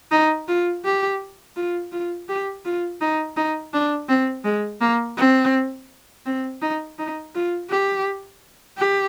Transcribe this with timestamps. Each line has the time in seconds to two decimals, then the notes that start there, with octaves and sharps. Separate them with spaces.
0.11 D#4
0.48 F4
0.85 G4
1.56 F4
1.92 F4
2.29 G4
2.65 F4
3.01 D#4
3.36 D#4
3.74 D4
4.09 C4
4.45 G#3
4.81 A#3
5.17 C4
6.26 C4
6.62 D#4
6.99 D#4
7.35 F4
7.70 G4
8.78 G4